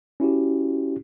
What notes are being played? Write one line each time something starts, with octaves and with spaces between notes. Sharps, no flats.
C#4 E4 F#4 G4